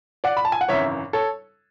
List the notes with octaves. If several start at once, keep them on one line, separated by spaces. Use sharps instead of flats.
D5 F#5
B5
A5
G#5
F#5
G#1 F#2 C#3 E3 C#5 E5
A4 C#5